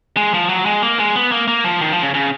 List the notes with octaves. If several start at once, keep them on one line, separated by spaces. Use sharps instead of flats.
G#3
F3
F#3
G#3
A#3
G#3
B3
A#3
A#3
F3
D#3
F3
C#3
C#3